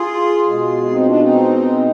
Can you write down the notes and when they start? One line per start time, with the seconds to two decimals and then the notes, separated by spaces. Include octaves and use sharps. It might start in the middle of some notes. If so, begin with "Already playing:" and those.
Already playing: F4 G#4
0.46 B2 G#3
0.83 F4
0.91 C4 D#4
1.06 D4 F4
1.21 C4 D#4